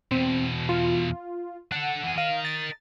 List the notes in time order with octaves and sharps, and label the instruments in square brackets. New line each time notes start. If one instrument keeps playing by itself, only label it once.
[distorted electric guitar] E2 B2 [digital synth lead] C4
[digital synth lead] F4
[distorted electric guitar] D4 A4 [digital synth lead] F#5
[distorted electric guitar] E3 G#4
[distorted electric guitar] A#4 D#5 [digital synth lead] F5
[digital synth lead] A6